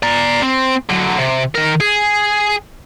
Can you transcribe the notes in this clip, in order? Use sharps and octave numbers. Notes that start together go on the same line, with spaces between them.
D5 A#5
C4
D3 F#3
C3
D#3 A#4
G#4